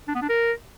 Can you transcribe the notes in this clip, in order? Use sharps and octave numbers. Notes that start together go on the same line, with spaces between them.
D4
B3
D4
A#4